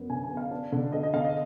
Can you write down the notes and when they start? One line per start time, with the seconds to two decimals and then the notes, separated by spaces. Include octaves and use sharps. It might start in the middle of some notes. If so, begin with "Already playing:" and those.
Already playing: F#2 B3
0.10 D3 G#5
0.24 G#5
0.30 B3
0.37 F5
0.51 D4
0.72 D3
0.92 D3 D#5
1.03 D#5
1.13 D3 F5
1.25 D#5